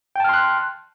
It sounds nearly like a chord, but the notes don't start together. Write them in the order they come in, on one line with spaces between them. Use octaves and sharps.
G5 A5 F6 C6 F#6